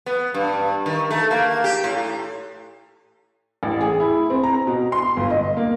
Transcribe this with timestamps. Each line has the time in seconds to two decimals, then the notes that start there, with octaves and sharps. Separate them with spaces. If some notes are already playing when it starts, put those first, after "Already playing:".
0.06 B3
0.34 G2
0.86 D#3
1.11 A3
1.31 A#3
1.64 G4
1.84 A2
3.63 A1
3.81 G#4
4.00 E4
4.30 C4
4.43 A#5
4.67 B2
4.92 C6
5.17 G1
5.30 D#5
5.57 A#3